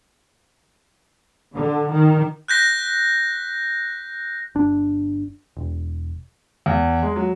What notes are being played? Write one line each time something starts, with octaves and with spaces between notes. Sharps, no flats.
D3
D#3
F#6 G6 A#6 B6
G1 D4
E1
E2
G#3
F#3